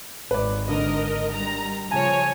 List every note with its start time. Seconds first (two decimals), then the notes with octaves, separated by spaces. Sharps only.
0.31 G#1 B4 D5
0.69 D3 A#4 D#5
1.33 G3 A#5
1.91 C#3 F3 C#5 G#5 A5